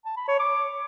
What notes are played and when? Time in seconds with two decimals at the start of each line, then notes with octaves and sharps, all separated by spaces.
0.05 A5
0.17 B5
0.28 C#5
0.39 D6